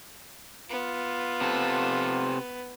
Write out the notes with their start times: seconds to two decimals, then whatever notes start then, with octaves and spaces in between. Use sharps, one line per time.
0.70 B3 F4
1.41 C3 A4